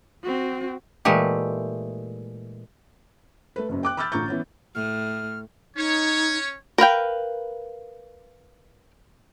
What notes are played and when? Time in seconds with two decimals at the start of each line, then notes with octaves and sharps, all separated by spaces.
0.23 C4 F#4
1.05 A#2 E3 G#3 A3 G4
3.56 A3 B4
3.69 F#1 F#2
3.83 G5 D6 F#6
3.97 B5 D6 E6 F6 G6 A6
4.12 A1 D3 F4 A#5 C#6 G6
4.28 E3 B3 C#4
4.75 A2 F6
5.76 C#4 D#4 C#5
6.78 A#4 B4 F5 G5